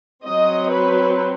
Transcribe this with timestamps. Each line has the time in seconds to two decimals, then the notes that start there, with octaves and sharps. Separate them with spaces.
0.24 F#3 C4 D#5
0.71 B4